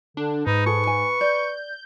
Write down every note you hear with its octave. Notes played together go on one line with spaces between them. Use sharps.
D3 D4
G#2 D#4 B4
G#4 A4 C#6
G#5
D5 G6